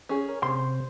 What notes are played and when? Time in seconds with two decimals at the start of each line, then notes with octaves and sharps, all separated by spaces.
0.09 C#4 G#4
0.29 A#4 C#5
0.43 C3 C5 C6